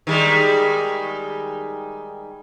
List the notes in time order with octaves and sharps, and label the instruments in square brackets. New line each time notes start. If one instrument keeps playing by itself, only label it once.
[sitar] D#3 G3 G#3